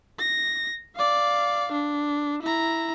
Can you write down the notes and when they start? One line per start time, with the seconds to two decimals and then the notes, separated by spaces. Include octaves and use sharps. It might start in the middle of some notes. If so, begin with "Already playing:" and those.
0.19 A#6
0.96 D5 F5
1.73 D4
2.43 E4 A#5